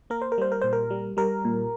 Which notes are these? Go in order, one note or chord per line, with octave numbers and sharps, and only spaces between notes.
A#3 A#4
C5
A#4
G3 C5
A#4
A#2 C5
A#4
G3
G3 A#4
A#2